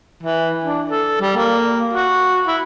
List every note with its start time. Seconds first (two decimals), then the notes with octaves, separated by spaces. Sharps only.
0.23 E3
0.64 D4
0.90 A4
1.21 G3
1.36 A#3
1.93 F#4
2.47 E4